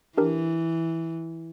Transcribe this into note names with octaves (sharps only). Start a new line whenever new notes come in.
E3 D4 G4 A#4